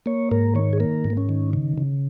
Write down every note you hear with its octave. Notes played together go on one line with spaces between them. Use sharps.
A#3 C#5
G#2 A#4
D#3 C#5
G#4
A#3 A#4
G#2
A#3
C#4
D#3
C#3
C#3